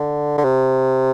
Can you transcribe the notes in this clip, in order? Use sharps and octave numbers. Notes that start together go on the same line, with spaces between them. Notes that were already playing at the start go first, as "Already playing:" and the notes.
Already playing: D3
D3
C3